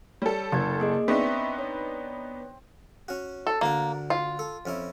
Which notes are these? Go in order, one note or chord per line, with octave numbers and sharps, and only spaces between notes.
G3 A4 C#5
F#1 G#6 A6
A#3 G#4 D#5
B3 C4 D4 D#4 E5 C#6 B6
C#5
C#4 F#4
A4
D2 D3 A#3 D4
F4
A4
F2 C#4 E4